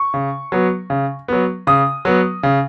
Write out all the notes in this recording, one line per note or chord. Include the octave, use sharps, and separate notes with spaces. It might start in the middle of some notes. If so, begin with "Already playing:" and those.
Already playing: C#6
C#3
F#3 B3
C#3
F#3 B3
C#3 D#6
F#3 B3
C#3